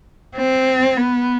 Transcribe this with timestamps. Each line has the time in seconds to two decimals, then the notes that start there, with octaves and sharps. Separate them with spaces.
0.37 C4
0.97 B3